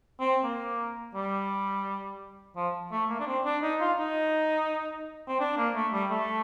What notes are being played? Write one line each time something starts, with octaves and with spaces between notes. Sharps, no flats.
C4
A#3
G3
F3
A3
A#3
D4
C4
D4
D#4
F4
D#4
C4
D4
A#3
A3
G3
A3